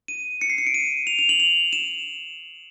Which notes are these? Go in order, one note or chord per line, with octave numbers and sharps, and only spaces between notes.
D#7
C#7
C7
C#7
D7
D#7
F7
F7
F#7
F7
E7